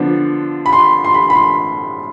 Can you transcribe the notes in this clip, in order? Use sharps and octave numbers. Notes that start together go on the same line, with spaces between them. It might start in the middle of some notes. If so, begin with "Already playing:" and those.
Already playing: D3 F3 B3 D4
B5
C6
C6
B5
B5
C6